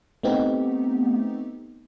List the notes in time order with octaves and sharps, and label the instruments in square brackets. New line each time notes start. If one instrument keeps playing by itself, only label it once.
[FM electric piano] A3 B3 C4 D#4 G4